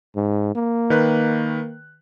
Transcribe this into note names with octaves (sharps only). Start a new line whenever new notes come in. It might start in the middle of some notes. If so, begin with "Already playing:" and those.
G#2
A#3
D#3 B4 F#6